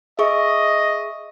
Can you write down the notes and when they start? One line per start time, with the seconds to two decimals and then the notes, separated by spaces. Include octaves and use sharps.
0.19 G#4 D#5 E5 C#6